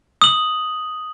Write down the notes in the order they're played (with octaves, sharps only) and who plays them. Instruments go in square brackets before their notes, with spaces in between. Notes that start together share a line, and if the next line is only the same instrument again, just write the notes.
[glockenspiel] D#6 F#7